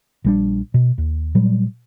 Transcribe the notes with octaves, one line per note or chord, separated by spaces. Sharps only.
A#1 G3 D4
B2
D#2
A#2 F#3 G3